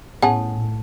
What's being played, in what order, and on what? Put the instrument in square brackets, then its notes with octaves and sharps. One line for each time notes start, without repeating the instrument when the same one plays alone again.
[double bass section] A2 [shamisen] B3 C#4 G#4 [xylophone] F#5 [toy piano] A5